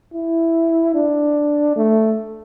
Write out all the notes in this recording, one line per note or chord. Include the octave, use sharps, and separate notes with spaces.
E4
D4
A3